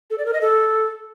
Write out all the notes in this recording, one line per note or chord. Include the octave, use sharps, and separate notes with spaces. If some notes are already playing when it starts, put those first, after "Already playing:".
A4
D5
A#4
D#5
A4